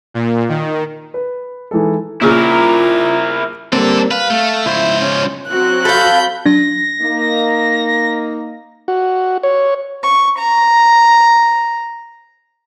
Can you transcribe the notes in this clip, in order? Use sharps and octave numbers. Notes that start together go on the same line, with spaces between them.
A#2
D#3
B4
E3 G#3 D#4 A4
A#2 C#3 E4 F4 A#4
G3 A#3 C4 D4 A4
B4 F5
A3
C#2 E4 C5
C#4
F#3 C4 F#4 F#6
A4 F5 B5 G6
F#3 D4 A#6
A#3 D#4
F#4
C#5
C#6
A#5